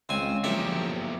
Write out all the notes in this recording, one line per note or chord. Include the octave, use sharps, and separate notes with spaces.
C#2 C4 C#4 G#5
E2 A#2 D3 F3 F#3 G4 E5